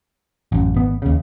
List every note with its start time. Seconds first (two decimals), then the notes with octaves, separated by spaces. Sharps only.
0.52 A1 F#2
0.74 G#1 B3
1.02 D#2 C#3